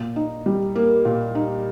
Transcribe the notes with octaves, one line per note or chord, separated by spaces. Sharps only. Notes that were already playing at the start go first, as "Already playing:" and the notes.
Already playing: A#2
D#4
G3
A#3
A#2
D#4